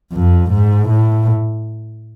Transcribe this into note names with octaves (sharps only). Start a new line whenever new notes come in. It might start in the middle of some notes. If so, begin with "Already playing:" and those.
F2
G#2
A2